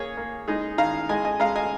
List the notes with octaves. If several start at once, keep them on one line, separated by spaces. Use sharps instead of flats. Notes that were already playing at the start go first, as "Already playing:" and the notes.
Already playing: A#3 G#4 C#5
A#3
G#3 D#4 G#4
D#3 F5 A#5
G#3 D#5 G#5
D#5 G#5
G#3 F5 A#5
D#5 G#5